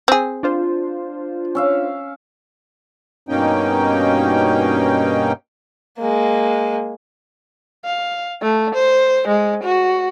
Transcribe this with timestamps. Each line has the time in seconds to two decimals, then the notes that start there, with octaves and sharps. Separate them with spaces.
0.08 C4 G#4
0.43 D4 F4 C5
1.55 C#4 E5 F5
3.29 G2 B2 A#3 C#4 D#4 G5
5.98 G#3 A#3
7.85 F5
8.42 A3
8.75 C5
9.28 G#3
9.64 F#4